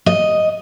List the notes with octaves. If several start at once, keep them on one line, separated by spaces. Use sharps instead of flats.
D#5